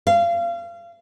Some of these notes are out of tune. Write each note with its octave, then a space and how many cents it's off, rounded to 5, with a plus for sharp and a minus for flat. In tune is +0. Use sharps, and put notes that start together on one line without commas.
F5 -30